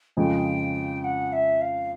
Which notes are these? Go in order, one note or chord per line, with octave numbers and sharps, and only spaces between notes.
F2 C#3 F3 G#3 G5
F#5
E5
F5